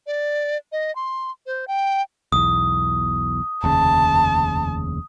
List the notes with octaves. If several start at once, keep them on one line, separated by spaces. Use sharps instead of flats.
D5
D#5
C6
C5
G5
B1 E2 D#6
F1 D#2 C#3 A5